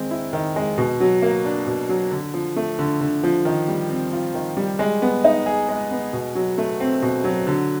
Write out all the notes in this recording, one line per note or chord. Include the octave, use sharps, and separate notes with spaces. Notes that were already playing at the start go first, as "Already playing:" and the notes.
Already playing: D#3 G#3 C4
E4
D#3
G#3
B2
F#3
A#3
D4
B2
F#3
D3
F3
A3
D3
D3
F3
D#3
G3
C4
F4
D#3
G3
G#3
B3
D#4
G#4
G#3
B3
B2
F#3
A3
C4
B2
F#3
D3